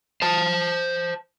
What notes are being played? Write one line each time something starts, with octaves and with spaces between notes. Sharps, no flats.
C5 A5